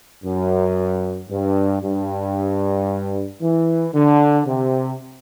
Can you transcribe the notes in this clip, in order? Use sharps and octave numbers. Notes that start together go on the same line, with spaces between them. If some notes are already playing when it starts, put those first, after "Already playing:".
F#2
G2
G2
E3
D3
C3